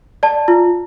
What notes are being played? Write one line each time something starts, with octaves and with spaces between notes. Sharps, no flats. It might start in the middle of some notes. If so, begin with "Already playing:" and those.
D5 A5
F4